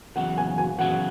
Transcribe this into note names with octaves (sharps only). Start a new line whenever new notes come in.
E2 C#3 F#3 F#5
G#5
G#5
E2 C#3 F#3 F#5